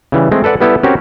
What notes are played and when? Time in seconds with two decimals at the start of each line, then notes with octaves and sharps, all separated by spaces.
0.12 C#3 E3 G3
0.32 G#3 A3 C4
0.44 A4 B4 D5 F#5
0.61 G3 B3 E4 G4 A4
0.83 C4 C#4 F#4 G4 A#4